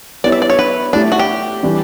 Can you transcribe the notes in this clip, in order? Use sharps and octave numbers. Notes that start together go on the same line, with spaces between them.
B3 E4 G4 C#5 D5
E5
D5
C#5
B4
A3 D4 E4 G4
F#4
G4
E3 G3 D4